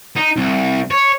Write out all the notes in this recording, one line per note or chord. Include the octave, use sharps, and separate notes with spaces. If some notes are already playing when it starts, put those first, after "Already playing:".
D#4
C2
C#5